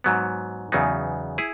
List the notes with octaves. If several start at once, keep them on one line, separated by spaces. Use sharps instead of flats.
G#2 F#3 B3
E2 C#3 F#3 B3 D#4
E4 G#4